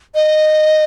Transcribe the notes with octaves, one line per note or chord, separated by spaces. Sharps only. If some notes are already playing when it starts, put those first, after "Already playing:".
D#5